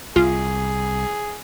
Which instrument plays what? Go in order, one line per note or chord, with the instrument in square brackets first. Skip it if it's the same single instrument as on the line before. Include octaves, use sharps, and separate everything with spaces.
[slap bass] C2 [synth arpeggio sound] F4 [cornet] G#4